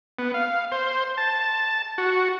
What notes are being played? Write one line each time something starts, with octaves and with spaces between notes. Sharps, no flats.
B3
F5
C5
A5
F#4